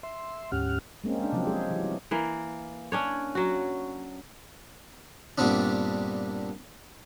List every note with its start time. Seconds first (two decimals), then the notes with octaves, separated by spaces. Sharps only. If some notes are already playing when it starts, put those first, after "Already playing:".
0.03 E5 C6
0.52 D2 G#2 C#4 G4 F#5 F6
1.04 G#3 A#3 C4 C#4
1.19 G#3 D4
1.33 C3 F3 F#3 C4
1.47 G#3 G4 G#4
1.70 E3 F#3
1.83 G3
2.11 E3 A#3
2.92 C#4 D4 C#5
3.35 F#3 F#4
5.38 G2 A#2 G3 B3 C4 D4